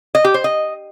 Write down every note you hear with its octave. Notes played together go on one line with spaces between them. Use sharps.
D#5
G4
C5
D#5